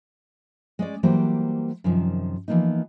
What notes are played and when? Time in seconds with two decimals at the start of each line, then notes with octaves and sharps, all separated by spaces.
0.79 G#3 C#4 D5
1.03 E3 F#3 G3 A#3 G4 C5
1.84 F#2 C3 D#3 F3
2.48 E3 F3 A#3 B3 D#4